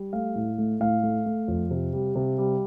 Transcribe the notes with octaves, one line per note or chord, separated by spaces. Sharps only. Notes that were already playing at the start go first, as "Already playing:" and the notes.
Already playing: G3
A3 F5
A2
A3
A2 F5
A3
A3
F2
C3
G3
C3
G3